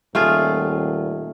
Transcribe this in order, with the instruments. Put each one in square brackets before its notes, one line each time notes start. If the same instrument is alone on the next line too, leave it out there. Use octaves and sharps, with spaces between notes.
[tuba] D#1 [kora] A3 F4 G#4